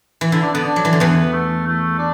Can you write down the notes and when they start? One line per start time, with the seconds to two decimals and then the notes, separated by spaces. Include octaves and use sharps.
0.21 E3
0.32 D3 E4
0.43 D4
0.53 D3 B3
0.64 D4
0.76 F#3
0.85 E3
0.93 D3
0.99 E2 E3 B3
1.32 A3
1.66 A3
1.99 D4